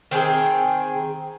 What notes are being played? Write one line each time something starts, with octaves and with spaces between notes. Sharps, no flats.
D#3 C4 G#4 G5